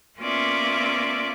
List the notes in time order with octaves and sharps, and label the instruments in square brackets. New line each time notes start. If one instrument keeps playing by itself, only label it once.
[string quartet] A#3 B3 C#4 F4 D5 E5